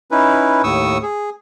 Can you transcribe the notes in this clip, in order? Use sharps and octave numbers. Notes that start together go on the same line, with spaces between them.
C#4 D#4 E4 B4
D#2 A2 C#6 D#6 E6
G#4